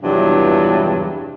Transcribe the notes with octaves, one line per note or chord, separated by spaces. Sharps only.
E2 G2 C3 F3 F#3